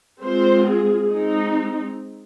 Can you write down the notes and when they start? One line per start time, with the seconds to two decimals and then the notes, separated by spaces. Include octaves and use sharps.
0.21 G#3 C4 F4 C5
0.65 G#4
1.08 G#3 C4 D#4